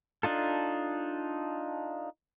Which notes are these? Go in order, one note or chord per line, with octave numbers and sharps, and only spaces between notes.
D4 D#4 F4 A4